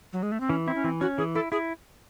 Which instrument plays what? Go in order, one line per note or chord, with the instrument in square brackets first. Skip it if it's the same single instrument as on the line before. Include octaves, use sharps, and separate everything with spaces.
[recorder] F#3
G#3
A3
C4
[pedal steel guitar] E3 [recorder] C#4
[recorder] C4 [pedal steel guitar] E4
[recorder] C#4
[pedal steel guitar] E3 [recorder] C4
[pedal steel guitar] C#4 [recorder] F#4
[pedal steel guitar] E3 [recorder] G#4
[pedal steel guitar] E4 [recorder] A4
[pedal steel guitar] E4 [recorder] G#4